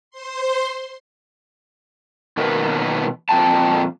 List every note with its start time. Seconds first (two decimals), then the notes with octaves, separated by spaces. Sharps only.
0.11 C5 C6
2.37 B2 D#3 F#3 A#3 A#4 B4
3.29 F2 A#2 G5 A5